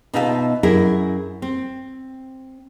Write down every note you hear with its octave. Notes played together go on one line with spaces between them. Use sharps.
B2 D#4 F4 E5 G5 A5
F#2 E4 G#4 A#4
C4